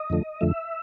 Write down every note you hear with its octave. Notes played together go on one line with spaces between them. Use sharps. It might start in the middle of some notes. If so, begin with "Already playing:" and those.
Already playing: D#5
F2 D3 F3 A3
F2 D3 F3 A3 E5